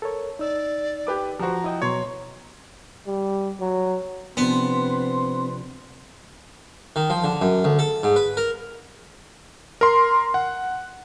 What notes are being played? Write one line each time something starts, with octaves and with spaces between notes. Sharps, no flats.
A4 A#4 C#5
D#4 D5 E6
G4 B4 D6
F3 F#4 G4 C5 A#5
E4 D#5 G5
B2 F#3 C#5 C6
G3
F#3
C3 F3 B3 C4 D4 B4 C6
D#3
F3
D3
F#2
D2
A4
G#2
B4
A#4
A#4 C6
F#5